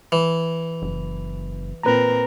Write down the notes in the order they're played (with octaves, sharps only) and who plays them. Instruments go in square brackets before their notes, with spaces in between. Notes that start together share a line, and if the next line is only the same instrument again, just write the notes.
[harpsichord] E3
[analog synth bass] F#1
[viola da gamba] A#2 C4 A#4 [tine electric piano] B4 A#5